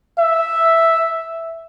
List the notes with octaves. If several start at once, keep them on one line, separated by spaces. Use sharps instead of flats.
E5